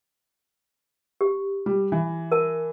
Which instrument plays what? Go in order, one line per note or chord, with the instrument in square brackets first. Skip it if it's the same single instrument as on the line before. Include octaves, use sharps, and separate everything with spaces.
[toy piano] G4
[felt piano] G3
E3
[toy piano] A#4 A5